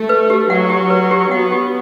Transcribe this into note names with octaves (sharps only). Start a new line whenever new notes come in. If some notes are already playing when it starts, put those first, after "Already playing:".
Already playing: A3
B4
G4
F#3 F#5
G4
B4
G4
B3 F#5
G4